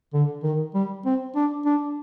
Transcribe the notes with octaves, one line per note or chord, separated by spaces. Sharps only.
D3
D#3
G3
C4
D4
D4